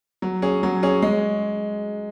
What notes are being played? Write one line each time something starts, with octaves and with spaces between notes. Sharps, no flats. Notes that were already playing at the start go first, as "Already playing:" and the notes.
F#3
C#4 G#4
F#3
C#4 G#4
G#3